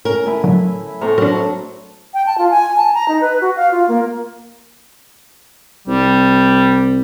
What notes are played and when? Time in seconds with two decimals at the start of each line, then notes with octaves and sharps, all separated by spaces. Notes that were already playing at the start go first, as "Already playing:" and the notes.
0.05 C#4 A#4
0.26 A3 E4 E5 G#5
0.44 A2 D3 F#3
1.01 A2 C4 A4 A#5 C6 C#6
1.18 F#3 D4 A#4
2.14 G5
2.26 A5
2.38 F4
2.50 G#5
2.77 A5
2.94 A#5
3.08 D#4
3.21 B4
3.41 F#4
3.56 F5
3.71 F4
3.88 A#3
5.88 C2 G3